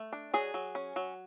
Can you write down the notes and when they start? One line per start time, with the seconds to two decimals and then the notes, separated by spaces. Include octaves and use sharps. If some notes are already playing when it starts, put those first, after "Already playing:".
Already playing: A3
0.13 D4
0.34 F#3 G#4
0.54 F#3
0.75 C#4
0.96 F#3